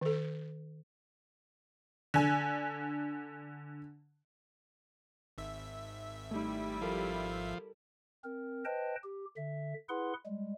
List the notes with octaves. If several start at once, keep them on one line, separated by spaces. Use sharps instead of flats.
D#3 A4
D3 G#5
G#1 E5
G3 A3 D#4 E4
F3 A4 A#4
C4 A#4
B4 C5 D#5 G5 A5
G4
D3 E5
E4 G#4 B4 F#5 C6
G3 G#3